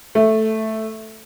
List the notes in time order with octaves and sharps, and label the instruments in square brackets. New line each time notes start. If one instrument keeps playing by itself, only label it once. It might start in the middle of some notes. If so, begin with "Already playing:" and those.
[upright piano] A3